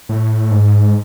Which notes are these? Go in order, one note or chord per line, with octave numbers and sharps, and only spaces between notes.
A2
G#2